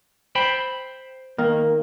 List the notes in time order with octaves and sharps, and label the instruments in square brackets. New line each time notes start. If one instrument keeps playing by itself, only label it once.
[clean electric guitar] C5 G5 B5
[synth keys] D#3 [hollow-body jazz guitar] A#3